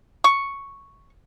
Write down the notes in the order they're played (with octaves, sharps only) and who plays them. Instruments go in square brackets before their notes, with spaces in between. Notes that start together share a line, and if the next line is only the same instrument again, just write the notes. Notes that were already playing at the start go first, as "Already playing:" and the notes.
[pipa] C#6